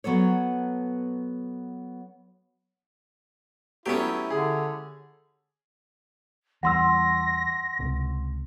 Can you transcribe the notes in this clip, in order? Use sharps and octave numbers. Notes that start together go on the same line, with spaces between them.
F#3 B3 A4 C#5
F#3 A3 B3 C#4 E4 G4
D3 G#4
E2 E3 G3 F#5 C6 E6 A#6
C#2 C3